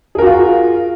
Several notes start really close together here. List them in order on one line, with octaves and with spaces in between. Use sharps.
G#4 A#4 F#4 F4